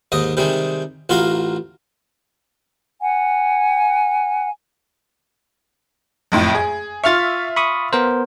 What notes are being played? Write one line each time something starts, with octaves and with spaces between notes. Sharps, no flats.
D#2 G#2 D#5 D#6
C3 D#3 G3 G#3
A1 F4 F#4 A#4 F5
F#5 G#5
F#1 F2 A2
G#4
F4 E5 C#6 F6 A6
B5 C#6 D#6
B3 A#4 C5